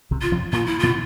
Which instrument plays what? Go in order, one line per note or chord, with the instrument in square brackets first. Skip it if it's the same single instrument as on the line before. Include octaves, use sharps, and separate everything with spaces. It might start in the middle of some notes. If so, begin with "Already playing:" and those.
[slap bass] C2 C3
[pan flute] F4
[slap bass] F2 F3
[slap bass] A#2 A#3 [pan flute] F4
[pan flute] E4
[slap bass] B2 B3 [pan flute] F4